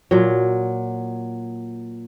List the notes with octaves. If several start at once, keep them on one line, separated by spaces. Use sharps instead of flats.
A#2 F#3